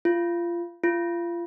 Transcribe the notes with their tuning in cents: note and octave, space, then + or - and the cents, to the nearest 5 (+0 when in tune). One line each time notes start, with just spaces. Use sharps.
F4 -25
F4 -30